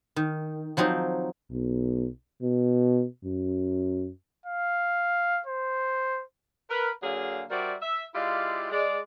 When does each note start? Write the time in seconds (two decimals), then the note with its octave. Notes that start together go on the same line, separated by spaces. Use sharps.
0.16 D#3
0.77 F3 F#3 C4 D#4
1.51 B1
2.42 B2
3.25 F#2
4.46 F5
5.47 C5
6.70 A#4 B4
7.03 D3 F#3 A#3 G#4 F5 G#5
7.50 G3 F#4 A#4 C5 D5 E5
7.82 E5
8.15 G#3 E4 F4 G4 D5 F5
8.71 G#3 D5